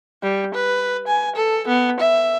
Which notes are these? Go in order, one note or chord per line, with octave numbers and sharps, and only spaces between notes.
G3
B4
G#5
A4
B3
E5